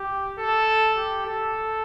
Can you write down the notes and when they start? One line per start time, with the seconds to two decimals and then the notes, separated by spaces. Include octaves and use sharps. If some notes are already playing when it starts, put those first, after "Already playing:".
Already playing: G4
0.38 A4
0.97 G4
1.26 A4